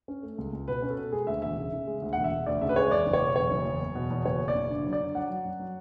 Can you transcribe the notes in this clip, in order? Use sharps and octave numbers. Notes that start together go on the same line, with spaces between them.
C#4
A3
C#2
C#2
B2 B4
C#4
A4
B2
G#3 G#4
D2 E5
E1 E5
C#3
C#3
G#3
D2
E1 F#5
E5
E1
D2 D5
C#3 E5
B4
G#3 C#5
E2 D5
F#1
C#5
B2
E2 C#5
F#1
E2
E2
B2
E2
F#1 C#5
B2
D5
F#1
D3
F#3
D5
D3
F#3 F#5
F#3
F#2
F#3